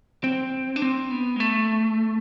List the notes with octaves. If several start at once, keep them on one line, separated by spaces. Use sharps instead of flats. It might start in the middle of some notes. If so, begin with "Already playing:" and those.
C4
D4
C4
B3
G#3
A3